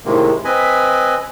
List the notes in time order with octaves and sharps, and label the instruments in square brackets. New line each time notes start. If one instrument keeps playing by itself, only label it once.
[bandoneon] A2 C3 D#3 G#3 A#3
C4 B4 D#5 G#5 B5